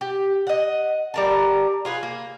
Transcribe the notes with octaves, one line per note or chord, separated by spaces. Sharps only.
G4
D#5 F#5
G3 A#4 A5
F4 G#4 A#4 B4
A#3